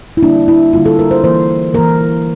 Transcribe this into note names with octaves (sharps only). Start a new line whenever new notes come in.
E4
D3 G3 A#3 D4
E4
D3 G3 A#3 F4
A4
A#4
C5
E3 A#3 C5
E3 A#3 A#4